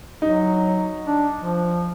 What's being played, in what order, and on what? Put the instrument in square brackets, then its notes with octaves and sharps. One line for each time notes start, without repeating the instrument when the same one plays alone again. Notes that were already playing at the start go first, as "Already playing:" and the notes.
[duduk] F#3 [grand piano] D#4
[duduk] D4
F3